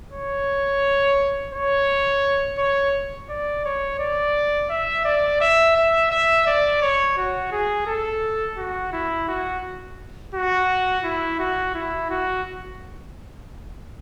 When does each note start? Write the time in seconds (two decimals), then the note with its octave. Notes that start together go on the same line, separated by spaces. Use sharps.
0.12 C#5
1.54 C#5
2.58 C#5
3.29 D5
3.65 C#5
3.99 D5
4.70 E5
5.05 D5
5.41 E5
5.76 E5
6.11 E5
6.46 D5
6.81 C#5
7.17 F#4
7.52 G#4
7.87 A4
8.57 F#4
8.92 E4
9.28 F#4
10.34 F#4
11.04 E4
11.39 F#4
11.74 E4
12.10 F#4